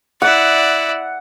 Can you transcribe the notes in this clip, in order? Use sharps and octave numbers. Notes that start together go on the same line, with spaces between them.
E4 D5 F#5